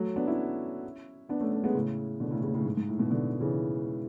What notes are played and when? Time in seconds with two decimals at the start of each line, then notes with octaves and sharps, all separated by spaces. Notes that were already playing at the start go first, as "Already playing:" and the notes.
Already playing: F#3 A3
0.16 B3 D4
0.27 C#4 E4
1.29 B3 D4
1.41 A3 C#4
1.52 A3 C#4
1.64 G#3 B3
1.75 A2 C#3
2.20 B2 D3
2.31 A2 C#3
2.43 A2 C#3
2.54 A2 C#3
2.66 G#2
2.77 G#2
2.89 A2
2.99 G#2 B2
3.11 B2 D3
3.41 C#3 E3